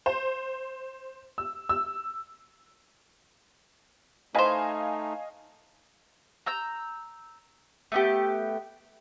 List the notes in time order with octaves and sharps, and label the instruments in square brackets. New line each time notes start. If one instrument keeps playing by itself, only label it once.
[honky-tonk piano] C5
E6
E6
[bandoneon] A3 D#4 [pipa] B4 C5 [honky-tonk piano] D#5 F5 G#5
[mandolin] A#5 E6 G6
A3 B3 G4